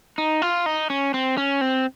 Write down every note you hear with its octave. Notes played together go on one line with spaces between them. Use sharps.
D#4
F4
D#4
C#4
C4
C#4
C4